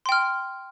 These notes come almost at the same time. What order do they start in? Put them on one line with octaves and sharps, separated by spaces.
C6 G5 F6